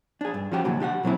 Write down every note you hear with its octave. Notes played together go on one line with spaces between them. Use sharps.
D4 G#4
G2
F3 C#4 F#4 G4
C2 A#2 D3 F#3
D4 G4 F5 F#5
A#2 F#3 C4 E4